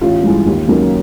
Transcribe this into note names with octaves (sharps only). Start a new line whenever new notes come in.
A1 F4
G2 E3 G#3
D#2
C#3 F#3 A#3 D#4